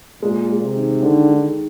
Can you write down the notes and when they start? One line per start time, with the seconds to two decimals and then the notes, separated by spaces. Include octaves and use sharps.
0.22 A#2 G#3
0.49 G#3
0.62 C3
0.76 D#3
1.03 D3 D#3
1.30 D#3